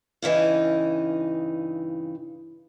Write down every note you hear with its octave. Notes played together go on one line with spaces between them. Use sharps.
G2 C#3 E3 D#4